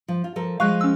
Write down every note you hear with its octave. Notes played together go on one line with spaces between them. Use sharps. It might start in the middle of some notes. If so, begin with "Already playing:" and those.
F3
F4
F3 A4 A#4
F3 G#3 F5 C#6 F#6
C#4 E6